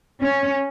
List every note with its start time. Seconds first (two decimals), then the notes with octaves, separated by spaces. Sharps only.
0.21 C#4